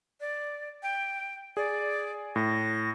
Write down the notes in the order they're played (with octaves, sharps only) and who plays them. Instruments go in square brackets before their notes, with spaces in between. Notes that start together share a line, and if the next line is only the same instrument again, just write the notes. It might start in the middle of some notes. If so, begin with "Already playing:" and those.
[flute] D5
G5
[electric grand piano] G#4 [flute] D5
[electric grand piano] A2 [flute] A#6